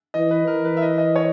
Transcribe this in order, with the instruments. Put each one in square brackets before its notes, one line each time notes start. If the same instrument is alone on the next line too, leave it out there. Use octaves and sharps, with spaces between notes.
[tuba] E3 [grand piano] D#5
[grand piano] B4
[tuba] E3 [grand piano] A#4
[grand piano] B4
E5
D#5
D#5
C#5